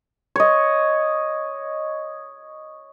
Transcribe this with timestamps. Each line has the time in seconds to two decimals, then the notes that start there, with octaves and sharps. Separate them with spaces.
0.36 C#5 D#5